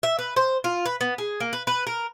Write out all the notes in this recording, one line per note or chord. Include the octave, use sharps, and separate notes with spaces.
E5
B4
C5
F4
B4
B3
G#4
A#3
B4
B4
A#4